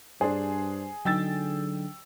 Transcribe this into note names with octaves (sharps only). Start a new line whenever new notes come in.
G2 D4 G#4 C5
D3 F#3 D#4 G5 E6 A6